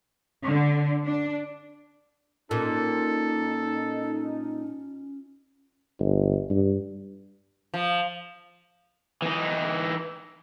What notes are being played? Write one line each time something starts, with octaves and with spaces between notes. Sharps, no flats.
D3
D4
A#2 C#4 D#4 A4
G1
G2
F3
E3 D#4